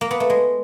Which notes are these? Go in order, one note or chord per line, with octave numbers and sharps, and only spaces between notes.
A#3
B3
A3
G#3